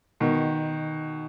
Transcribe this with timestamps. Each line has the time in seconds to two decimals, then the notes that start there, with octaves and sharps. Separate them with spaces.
0.20 B2 D#3